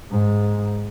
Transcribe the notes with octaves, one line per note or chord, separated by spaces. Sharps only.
G#2